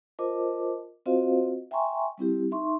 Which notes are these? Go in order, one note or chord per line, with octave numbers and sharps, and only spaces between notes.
F4 A#4 C5 D#5 A5 D6
C4 F4 F#4 C5 D#5 F5
E5 G5 G#5 A#5 C6 C#6
G3 C4 E4 G4
D#4 E5 C6 C#6